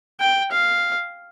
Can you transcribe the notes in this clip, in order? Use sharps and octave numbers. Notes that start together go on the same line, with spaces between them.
G5
F5